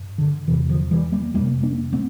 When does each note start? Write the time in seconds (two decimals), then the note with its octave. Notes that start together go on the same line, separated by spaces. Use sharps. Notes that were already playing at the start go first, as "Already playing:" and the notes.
Already playing: G2
0.18 D3
0.47 E2 C3 E3
0.69 D3 F3
0.91 E3 G3
1.12 G3 A#3
1.34 F2 G3 A#3
1.39 C3
1.63 A#3 D4
1.93 A3 C4